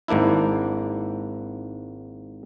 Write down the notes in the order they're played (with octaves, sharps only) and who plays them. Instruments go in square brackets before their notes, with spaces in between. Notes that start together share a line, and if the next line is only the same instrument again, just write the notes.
[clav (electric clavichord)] G#1 G#2 A#3 D4 E4